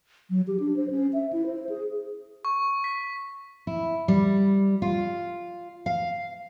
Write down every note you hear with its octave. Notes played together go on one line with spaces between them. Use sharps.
F#3
G4
D4
C5
C#4
E5
E4
C5
G#4
C#6
B6
E4
G3
F4
F5